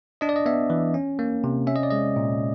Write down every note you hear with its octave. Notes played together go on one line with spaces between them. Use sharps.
D4 D#5
D5
D#5
B3 E5
E3
C#4
A#3
C3
C#4 E5
D#5
D5
G#3 D#5
A#2